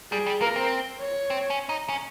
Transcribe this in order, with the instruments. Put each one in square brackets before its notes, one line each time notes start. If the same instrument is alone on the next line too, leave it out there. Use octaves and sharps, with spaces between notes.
[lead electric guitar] G3 [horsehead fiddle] G#4
[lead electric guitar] G3
[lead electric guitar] A#3 [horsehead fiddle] A#4
[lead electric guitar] C4
[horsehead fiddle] C#5
[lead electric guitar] C4
C#4
D#4
C#4